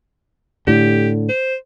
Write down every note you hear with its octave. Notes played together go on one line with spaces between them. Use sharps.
A2 D3 G4
C5